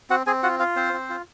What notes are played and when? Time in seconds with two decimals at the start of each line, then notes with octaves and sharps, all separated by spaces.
0.10 C4 F#4 F#5
0.26 C4 G#4 G#5
0.43 F4 F#4 F#5
0.59 F4 F5
0.76 C4 C5
0.93 C4
1.10 F4